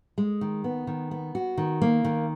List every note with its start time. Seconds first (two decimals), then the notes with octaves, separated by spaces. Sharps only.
0.18 G#3
0.41 D#3
0.64 B3
0.87 D#3
1.11 B3
1.35 F#4
1.58 D#3
1.82 A#3
2.05 D#3